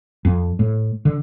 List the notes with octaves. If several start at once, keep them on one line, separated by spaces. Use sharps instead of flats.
F2
A2
D3